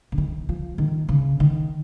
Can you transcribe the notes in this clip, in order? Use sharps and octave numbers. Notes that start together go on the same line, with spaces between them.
C#3
D#3
F3
D#3
C#3
D#3